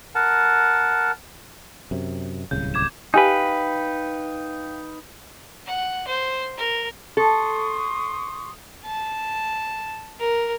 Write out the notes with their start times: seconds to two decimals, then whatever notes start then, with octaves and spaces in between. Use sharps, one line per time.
0.15 A#4 F#5 A5
1.91 F#2 C3
2.51 D1 C2 C#3 G6
2.74 D6 G#6 E7
3.14 D#4 G4 B4 F5 G5 G#5
5.66 F#5
6.07 C5
6.57 A#4
7.17 A4 C6 C#6 D#6
8.85 A5
10.20 A#4